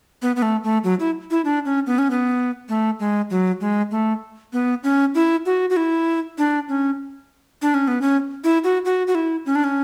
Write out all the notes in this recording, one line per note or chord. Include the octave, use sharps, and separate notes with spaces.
B3
B3
A3
A3
F#3
E4
E4
D4
C#4
B3
C#4
B3
A3
G#3
F#3
G#3
A3
B3
C#4
E4
F#4
F#4
E4
D4
C#4
D4
C#4
B3
C#4
E4
F#4
F#4
F#4
E4
C#4
D4
C#4